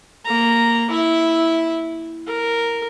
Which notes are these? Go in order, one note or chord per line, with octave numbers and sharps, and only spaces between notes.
A#3 A#5
E4 E5
A#4